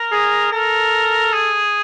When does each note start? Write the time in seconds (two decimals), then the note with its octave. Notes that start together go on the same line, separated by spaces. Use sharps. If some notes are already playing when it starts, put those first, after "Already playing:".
Already playing: A#4
0.12 G#4
0.51 A4 A#4
1.33 G#4